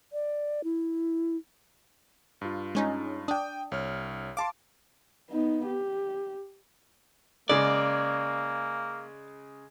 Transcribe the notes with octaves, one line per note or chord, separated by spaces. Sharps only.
D5
E4
G2 F4
G#3 C#4 D#4
D4 G5 D#6
C2 C#5 F6
F5 A5 C6 D6
B3 D#4
G4
C#3 G#3 A#3 D5